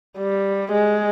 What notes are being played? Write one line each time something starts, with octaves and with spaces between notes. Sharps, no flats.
G3
G#3